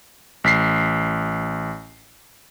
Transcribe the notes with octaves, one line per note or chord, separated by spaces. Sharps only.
A1 B6 C7